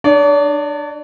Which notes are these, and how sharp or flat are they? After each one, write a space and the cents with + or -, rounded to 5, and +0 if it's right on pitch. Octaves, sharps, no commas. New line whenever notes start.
D4 +30 D5 -45